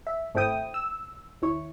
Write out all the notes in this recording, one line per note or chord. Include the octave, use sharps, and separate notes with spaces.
E5
G#1 A3 C4 E4 G5 D#6
E6
D#2 E4 C#5